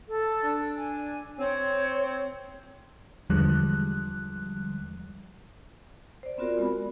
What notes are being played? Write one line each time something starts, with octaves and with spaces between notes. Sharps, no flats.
A4
D4
G#5
C4 C#5
E2 D3 F3 G3 G#3 F#6
C5 D5
B3 C4 F4 F#4 A#4 D5
G#3 D5 B5